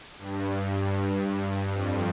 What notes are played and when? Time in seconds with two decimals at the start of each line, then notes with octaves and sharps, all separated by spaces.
0.18 G2
0.69 G2
1.74 F2